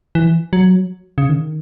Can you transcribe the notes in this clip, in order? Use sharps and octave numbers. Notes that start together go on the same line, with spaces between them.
E3
F#3
C#3
D#3